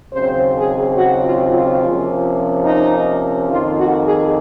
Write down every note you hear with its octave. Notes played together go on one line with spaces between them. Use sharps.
D#2 C#3 F#3 C4 C5
G#4
F#4
F4
F4
C3 F3 A#3 C#4
D#4
F2 D#3 A#3 F4
F#4
G#4